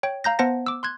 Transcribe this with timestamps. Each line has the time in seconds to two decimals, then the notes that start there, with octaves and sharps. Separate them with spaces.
0.03 C#5 G5
0.24 F5 A#5 G6 A#6
0.39 B3 C5 F#5 A5 A#6
0.66 D6 E6
0.83 C6 F#6 G#6